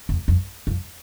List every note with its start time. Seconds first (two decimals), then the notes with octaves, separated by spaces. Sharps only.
0.09 E2
0.28 F2
0.67 F2